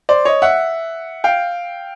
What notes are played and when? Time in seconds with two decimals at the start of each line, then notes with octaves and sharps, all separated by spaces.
0.09 C5 D5
0.25 C#5 D#5
0.42 E5 F#5
1.24 F5 G5